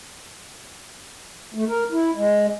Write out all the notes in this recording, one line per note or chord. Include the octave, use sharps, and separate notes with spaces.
A3
A#4
E4
G#3